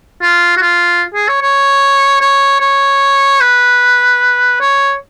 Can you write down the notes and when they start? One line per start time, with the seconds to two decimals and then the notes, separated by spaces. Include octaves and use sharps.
0.22 F4
0.57 F#4
0.61 F4
1.14 G#4
1.28 C#5
1.42 C#5
2.21 C#5
2.61 C#5
3.40 B4
4.60 C#5